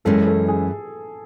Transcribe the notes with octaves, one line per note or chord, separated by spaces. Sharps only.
F#2 E3 G#3 C#4 A4
A4
G#4